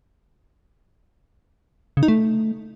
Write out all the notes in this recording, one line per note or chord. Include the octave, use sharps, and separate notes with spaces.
C#3
D#4
A3